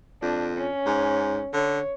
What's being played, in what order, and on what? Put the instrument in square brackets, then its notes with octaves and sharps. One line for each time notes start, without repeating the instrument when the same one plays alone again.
[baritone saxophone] F2 [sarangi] D4
[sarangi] C#4
[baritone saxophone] G#2
[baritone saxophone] D3 [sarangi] C#5